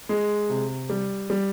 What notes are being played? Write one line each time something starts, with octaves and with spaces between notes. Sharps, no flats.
G#3
C3
G3
G3